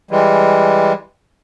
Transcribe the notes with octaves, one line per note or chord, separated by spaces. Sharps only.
E3 G3 G#3